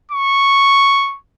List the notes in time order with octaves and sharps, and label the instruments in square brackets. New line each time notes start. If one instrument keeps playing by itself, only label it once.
[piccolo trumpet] C#6